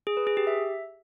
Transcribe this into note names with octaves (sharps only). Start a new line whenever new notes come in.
G#4
B4
G#4
G4
E5